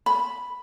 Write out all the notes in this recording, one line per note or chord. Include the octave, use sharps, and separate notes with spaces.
B5